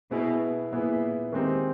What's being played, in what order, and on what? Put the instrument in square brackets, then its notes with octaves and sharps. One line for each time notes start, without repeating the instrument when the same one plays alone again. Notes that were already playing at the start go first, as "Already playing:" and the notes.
[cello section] B2 [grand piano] B3 E4 G#4
[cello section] A#2 [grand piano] B3 E4 G#4
[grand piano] D#3 G#3 C4 D#4 G4